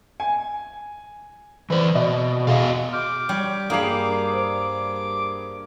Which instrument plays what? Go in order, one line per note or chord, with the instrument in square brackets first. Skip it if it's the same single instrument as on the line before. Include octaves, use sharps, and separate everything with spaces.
[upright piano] G#5
[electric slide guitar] E3 D5 [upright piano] B4 C5
[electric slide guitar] B2 [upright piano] D5 D#5
[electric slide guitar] B3 F#4 F5 [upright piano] G#4 D#5
[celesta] C6 F6 G6 [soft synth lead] D6
[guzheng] G3 [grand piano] C#5
[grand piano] G2 G#4 C7 [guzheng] A#3 B5 [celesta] D#6 G6 F7
[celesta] C5